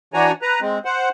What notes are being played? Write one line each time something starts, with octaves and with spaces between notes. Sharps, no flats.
E3 D4 F#4 C#5 G#5 A#5
B4 A#5
G#3 C4
C5 F#5